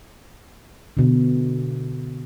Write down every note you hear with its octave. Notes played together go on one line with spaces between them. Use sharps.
B2 D3